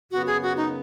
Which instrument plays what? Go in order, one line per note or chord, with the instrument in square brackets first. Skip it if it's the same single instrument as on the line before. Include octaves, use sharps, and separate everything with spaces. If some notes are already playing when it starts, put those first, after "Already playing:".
[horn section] F#2 C#3 B3 [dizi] F#4
[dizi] G#4
F#4
D#4